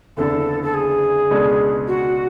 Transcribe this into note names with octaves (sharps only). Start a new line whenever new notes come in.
F#1 E2 D3 A4
A4
G#4
C#2 B2 G#3 D4 A4
F#4